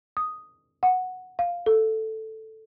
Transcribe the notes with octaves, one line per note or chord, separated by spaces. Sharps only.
D#6
F#5
F5
A4